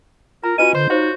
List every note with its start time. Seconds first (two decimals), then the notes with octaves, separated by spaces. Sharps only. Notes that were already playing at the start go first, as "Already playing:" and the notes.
0.44 F4 A#4 A#5
0.58 C#4 F4 F#4 B4 D#5 D#7
0.75 D3 C5 C6 G6
0.90 D#4 F#4 C5 C#5 F5